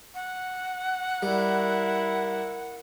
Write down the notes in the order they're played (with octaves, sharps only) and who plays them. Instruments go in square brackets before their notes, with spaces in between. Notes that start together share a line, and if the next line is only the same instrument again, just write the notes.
[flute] F#5
[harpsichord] G3 [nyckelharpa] E4 A#4